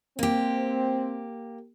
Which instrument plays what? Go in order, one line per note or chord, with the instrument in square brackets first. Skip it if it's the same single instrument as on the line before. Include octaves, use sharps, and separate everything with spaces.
[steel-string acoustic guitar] A#3 G4 [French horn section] C4